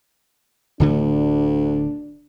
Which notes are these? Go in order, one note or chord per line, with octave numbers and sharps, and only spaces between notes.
D1 D2 D3 A3 D4